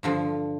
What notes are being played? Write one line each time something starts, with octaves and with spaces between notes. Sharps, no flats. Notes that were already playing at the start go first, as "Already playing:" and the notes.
G2 D3 F3